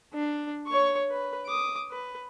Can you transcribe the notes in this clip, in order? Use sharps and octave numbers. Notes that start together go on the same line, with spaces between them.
D4
C#5 C#6
B4
D6 D#6
B4